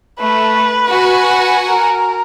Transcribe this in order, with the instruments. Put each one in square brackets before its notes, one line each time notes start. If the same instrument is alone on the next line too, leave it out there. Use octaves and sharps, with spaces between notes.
[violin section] A3 [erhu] B4
[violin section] F#4 F#5 G#5
[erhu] A#4